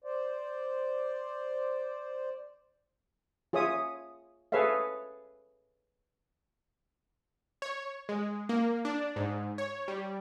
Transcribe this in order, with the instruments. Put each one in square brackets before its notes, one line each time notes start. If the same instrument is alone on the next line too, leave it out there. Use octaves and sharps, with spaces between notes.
[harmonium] C5 D5
[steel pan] F4 G#4 C#5 E5 D#6
G#4 A4 B4 C#5 E5 F5
[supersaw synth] C#5
G#3
A#3
D4
G#2
C#5
G3